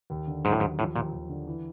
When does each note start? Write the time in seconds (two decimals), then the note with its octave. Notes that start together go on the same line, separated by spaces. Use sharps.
0.10 D#2
0.28 D3
0.44 G#2 F#3
0.52 A2
0.60 D#2 G#2
0.79 A2 F3
0.96 D#2 A#2
1.12 D#2
1.29 D3
1.47 E3